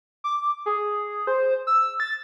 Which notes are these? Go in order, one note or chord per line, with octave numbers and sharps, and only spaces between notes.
D6
G#4
C5
E6
A6